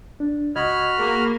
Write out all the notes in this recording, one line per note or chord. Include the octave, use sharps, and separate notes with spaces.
D4
C#2 F#4 D#5 B5 F6 G#6
A#3 G#4